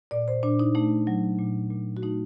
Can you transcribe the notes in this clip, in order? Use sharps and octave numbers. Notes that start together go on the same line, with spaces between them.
A#2 D5
C5
A#2 D4
D#4
A3 D#4
F#3
A#2
A#2
F#4
A3 D#4